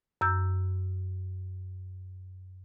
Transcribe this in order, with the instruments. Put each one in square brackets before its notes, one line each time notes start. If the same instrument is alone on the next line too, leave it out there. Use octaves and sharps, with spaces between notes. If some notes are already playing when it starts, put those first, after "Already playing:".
[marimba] F#2 E6 G6